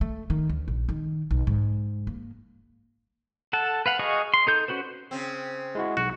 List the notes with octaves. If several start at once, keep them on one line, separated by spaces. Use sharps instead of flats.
A3
D#3
D2
A#1
D#3
B1
G#2
A#3
A4 F#5 A5
B4 F5 F#5
F#4 G#4 D#5 F5 C#6
C6
D#4 A4 G6
C#4 F#4 B4 C5
C#3 C4
G#3 E4 F#4
B1 F#4